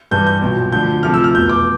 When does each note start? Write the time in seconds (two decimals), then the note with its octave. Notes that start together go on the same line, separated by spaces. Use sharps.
0.11 G2 E3 G3 G6
0.27 G6
0.42 B1 A#2 F#3
0.72 D2 D3 F3 G6
1.03 D2 C3 F3 A3 F6
1.14 E6
1.24 F6
1.34 F1 E2 B2 G6
1.49 D6